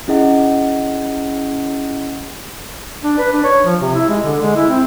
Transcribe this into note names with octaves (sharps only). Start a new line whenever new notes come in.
C#4 E4 G#4 D#5 F#5
D4
B4
D4
C#5
F3
C3
E4
G#3
D3
G#3
E4
C4